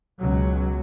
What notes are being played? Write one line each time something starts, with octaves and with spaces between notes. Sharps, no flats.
C#2 B2 F#3